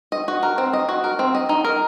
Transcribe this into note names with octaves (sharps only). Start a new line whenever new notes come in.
D#5
F#4
A#4
C4
D#5
F#4
A#4
C4
D#5
D#4
A#4